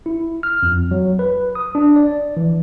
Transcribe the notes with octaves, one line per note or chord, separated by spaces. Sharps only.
E4
F6
F2
F#3
B4
D#6
D4
D5
E3